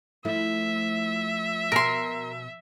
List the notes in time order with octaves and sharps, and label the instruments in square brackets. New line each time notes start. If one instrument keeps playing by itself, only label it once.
[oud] F3 A3 E4 [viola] E5
[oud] B2 [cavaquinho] A#4 C6